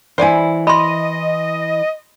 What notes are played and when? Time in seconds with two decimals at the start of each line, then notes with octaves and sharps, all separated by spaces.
0.18 E3 E4 C5 D5 G#5
0.67 D#5 B5 C6